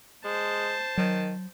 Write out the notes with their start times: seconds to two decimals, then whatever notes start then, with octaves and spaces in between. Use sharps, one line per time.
0.25 G#3 C5 A5
0.97 D#3 F#3